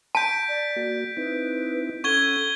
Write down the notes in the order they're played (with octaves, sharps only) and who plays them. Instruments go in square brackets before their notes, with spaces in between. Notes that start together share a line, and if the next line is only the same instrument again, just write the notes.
[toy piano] A5 [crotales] G6 B6 D7
[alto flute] D5
[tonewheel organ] A#3 F#4
[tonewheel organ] C4 D#4 E4 [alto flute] B4
[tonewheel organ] C#4 F#5 [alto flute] A4 [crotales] C#6 G#6 G7